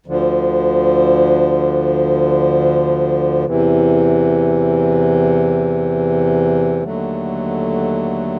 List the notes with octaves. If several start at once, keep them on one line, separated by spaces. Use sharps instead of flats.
D2 D3 F3
E2 C3 E3
D#2 D3 F#3 A3